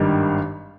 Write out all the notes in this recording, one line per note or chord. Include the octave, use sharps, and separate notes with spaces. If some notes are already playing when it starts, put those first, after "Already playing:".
Already playing: G#1 G2 D#3 G3 D4